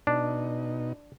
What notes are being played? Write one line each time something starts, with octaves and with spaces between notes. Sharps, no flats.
B2 D4 D#4